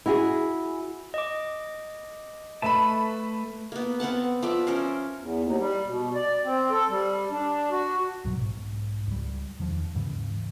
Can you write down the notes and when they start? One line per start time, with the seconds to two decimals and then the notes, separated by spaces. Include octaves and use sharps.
0.06 E4 F#4 G#4
1.14 D#5 D6
2.62 A3 B4 E5 A5 B5
3.72 A#3 B3
4.00 B3 C4 F#5 A5
4.43 F3 A3 D5 E5
4.67 C#4 A#4 C5
5.19 E2
5.43 D#2
5.58 G3
5.86 B2
6.15 D5
6.45 C4
6.71 A4
6.89 G3
7.31 D4
7.71 F#4
8.24 C2 G#2 B2 F#3
8.37 B1 G#2
9.07 C#2 G3
9.59 E2 D#3 F3
9.94 D#2 G#2 C#3 E3